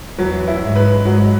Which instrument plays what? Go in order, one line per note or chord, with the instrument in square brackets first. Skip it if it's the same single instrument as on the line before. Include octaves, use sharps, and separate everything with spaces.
[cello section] E2 E3 [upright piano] F#3
[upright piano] E4
[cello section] G#2 G#3
[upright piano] B4
[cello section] G#2 G#3 [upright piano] F#3